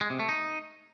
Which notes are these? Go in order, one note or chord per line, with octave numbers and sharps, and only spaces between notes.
G#3
C3
A3
D#4